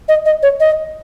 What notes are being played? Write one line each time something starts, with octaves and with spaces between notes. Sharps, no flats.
D#5
D#5
C#5
D#5